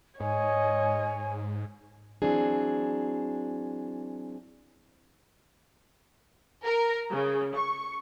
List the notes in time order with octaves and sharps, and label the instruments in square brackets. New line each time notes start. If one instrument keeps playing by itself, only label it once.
[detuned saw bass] G#2 [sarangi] C#5 [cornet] D#5 [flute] G#5
[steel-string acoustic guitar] E3 F#3 C4 D4 G#4
[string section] A#4
C#3
C#6